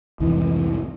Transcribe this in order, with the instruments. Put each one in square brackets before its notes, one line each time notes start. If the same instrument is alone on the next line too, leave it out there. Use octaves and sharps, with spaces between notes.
[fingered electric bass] C2 F2 G#2 [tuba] E3